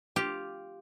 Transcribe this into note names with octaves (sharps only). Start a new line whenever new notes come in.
F4 G4